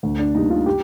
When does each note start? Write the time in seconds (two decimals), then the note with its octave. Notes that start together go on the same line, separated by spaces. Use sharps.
0.03 D2
0.19 D4
0.35 D3 G3 A#3 D#4
0.50 F4
0.66 G4